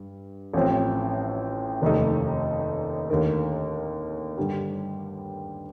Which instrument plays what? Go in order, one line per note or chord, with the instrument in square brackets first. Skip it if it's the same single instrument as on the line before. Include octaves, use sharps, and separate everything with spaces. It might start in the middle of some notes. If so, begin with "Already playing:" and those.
Already playing: [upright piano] G2
A1 A2 F3 C4
F1 D#2 D#3 A3 D#4
D#2 D3 A3 D#4 A#4
G2 D3 G3